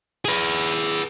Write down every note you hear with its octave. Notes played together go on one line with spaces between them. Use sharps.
G#4 B4